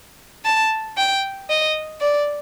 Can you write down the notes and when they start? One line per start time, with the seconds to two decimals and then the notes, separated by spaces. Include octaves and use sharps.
0.45 A5
0.97 G5
1.49 D#5
2.01 D5